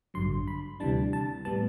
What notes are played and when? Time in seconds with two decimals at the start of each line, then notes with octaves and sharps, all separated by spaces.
0.14 A1 G2 D3 F#3 C6
0.48 B5
0.80 D2 C3 E3 G3 D4 A5
1.13 A5
1.45 A2 G3 B3 A5